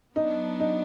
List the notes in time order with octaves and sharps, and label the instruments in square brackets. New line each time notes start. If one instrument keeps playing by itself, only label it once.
[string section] F#3 B3 D4 [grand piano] D#4
[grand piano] D#4